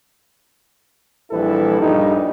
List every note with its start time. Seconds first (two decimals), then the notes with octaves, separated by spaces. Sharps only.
1.32 A#1 E3 G3 E4 A4 B4
1.81 A#1 G2 G3 D#4